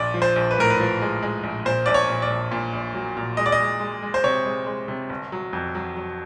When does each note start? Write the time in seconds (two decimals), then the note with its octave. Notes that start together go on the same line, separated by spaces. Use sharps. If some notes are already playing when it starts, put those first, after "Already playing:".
Already playing: A#1 D5
0.14 F3
0.22 C5
0.36 A#1
0.51 B4
0.58 A2 A#4
0.70 B4
0.80 F3
1.01 G#3
1.23 G#3
1.43 A#1
1.65 A#2 C5
1.86 A#1 D5
1.94 C#5
2.09 A#2
2.22 D5
2.30 A#1
2.52 A#2
2.73 A#1
2.95 F#3
3.17 A#2
3.37 G#3 D#5
3.46 D5
3.52 D#5
3.60 G#3
3.80 G#3
4.02 G#3
4.14 C5
4.24 C3 C#5
4.45 G#3
4.66 G#3
4.88 C3
5.10 G1
5.32 F#3
5.53 F2
5.75 F#3
5.96 F#3